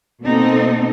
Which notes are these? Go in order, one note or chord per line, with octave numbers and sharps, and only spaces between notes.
B2 A#3 C4 D#4 A4